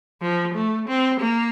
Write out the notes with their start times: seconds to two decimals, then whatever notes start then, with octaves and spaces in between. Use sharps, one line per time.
0.22 F3
0.55 A3
0.88 C4
1.20 A#3